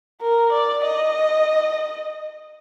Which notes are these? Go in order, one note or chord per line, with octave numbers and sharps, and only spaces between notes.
A#4
D5
D#5